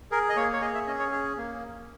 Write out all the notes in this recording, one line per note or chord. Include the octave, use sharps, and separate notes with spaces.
G#4 A#4
D#5
A#3 C#5
C#5
G#4 D#5
E5
C#4 D#5
C#5
G#4
A#3